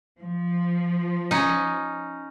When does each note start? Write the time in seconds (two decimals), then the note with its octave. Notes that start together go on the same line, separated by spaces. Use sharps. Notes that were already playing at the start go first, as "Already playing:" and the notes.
0.20 F3
1.31 C#4 D#4